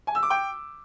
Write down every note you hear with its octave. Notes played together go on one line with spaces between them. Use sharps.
G#5
E6
D6
G5